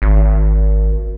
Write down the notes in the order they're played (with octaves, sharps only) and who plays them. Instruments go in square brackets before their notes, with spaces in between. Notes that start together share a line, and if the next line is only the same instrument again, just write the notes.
[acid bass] G#1